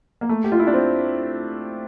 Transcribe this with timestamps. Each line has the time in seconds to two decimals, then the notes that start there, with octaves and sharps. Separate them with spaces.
0.21 A#3
0.29 A3
0.44 G4
0.52 F4
0.59 E4
0.67 D4
0.74 C4